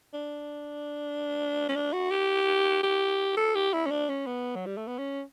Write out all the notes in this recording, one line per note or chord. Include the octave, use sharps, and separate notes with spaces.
D4
C#4
D4
F#4
G4
G4
A4
G4
E4
C#4
D4
C#4
B3
F#3
G3
A3
B3
C#4